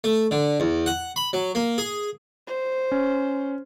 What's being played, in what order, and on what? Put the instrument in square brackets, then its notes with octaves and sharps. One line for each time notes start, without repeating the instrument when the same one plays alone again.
[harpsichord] A3
D3
E2
F#5
B5
F#3
A#3
G#4
[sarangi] C5
[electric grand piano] C#4